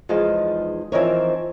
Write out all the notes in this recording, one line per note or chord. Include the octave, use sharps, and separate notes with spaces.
E2 F3 G#3 D#4 F5
E3 F3 C4 D#4 A#4 C#5